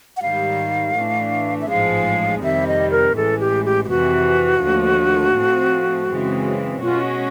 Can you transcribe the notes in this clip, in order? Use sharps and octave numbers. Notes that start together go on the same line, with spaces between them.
F#5
G#2 D#3 G3 F5
A2 E3 A3 D4
E5
A1 G#2 F3 G#3 F5
F2 C3 D#3 G3 E5
D#5
A#4
A1 A2 E3 G#3 A4
G4
G4
G4
F2 C3 E3 F#4
D#2 D3 F3 A3
A2 F3 A3 C4
F#2 C#3 E3 G#3 C4
B2 G#3 C#4 F4 F#4